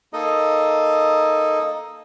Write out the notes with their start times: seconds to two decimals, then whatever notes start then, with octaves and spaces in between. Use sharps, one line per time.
0.13 A#3 D#4 A4 D#5